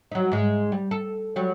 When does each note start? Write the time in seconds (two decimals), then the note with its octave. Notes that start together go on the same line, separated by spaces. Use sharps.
0.12 F#3 D#4
0.32 G#2 G#3
0.72 G3
0.91 A4
1.36 F#3 G3